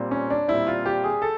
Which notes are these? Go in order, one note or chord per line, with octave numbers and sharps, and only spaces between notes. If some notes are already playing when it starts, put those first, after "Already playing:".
Already playing: A#2 G3 C4
C#4
D4
A#2 G3 C4 E4
F4
G4
G#4
A4